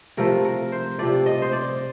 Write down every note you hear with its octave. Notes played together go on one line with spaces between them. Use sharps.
C3 F3 A3 A#4
A#4
C5
C3 F3 A3 D5
D#5
C5
D5